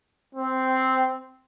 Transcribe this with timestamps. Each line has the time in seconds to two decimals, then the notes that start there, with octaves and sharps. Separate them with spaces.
0.35 C4